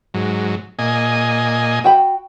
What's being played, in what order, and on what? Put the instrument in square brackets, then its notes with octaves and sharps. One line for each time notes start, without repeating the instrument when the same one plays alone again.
[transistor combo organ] G#2 F#3
A#2 D#5 G#5
[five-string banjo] F#4 G5 B5